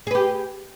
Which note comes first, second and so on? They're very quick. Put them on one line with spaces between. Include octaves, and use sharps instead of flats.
G#4 B4 G4